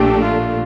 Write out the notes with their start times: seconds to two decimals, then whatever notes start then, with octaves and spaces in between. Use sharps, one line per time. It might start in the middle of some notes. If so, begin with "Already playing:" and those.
Already playing: A#1 A#2 A3 D4 G4
0.24 F4